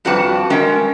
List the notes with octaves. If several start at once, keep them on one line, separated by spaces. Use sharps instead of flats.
F2 G3 F#4 B4 G5 A5
G#3 C#4 A#4 G5